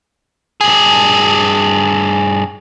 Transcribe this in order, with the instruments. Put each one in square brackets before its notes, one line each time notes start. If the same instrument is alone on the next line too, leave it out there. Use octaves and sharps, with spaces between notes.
[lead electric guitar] G2 G#4